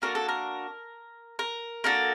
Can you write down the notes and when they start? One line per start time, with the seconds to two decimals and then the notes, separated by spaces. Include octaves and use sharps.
0.02 A#3 D4 F#4 A4 A#4
0.15 A4
0.29 A#4
1.39 A#4
1.84 A#3 D4 F#4 A4